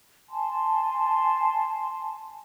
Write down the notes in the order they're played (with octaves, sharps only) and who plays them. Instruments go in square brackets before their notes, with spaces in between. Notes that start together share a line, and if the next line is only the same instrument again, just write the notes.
[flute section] G#5 A5 C6